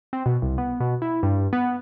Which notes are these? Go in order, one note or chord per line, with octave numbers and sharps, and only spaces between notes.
C4
B2
C2
B3
B2
E4
G2
B3